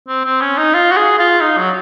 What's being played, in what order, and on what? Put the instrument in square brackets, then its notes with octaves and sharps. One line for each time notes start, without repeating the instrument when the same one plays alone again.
[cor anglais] C4
C4
C#4
D#4
F4
F#4
G#4
F4
D#4
F#3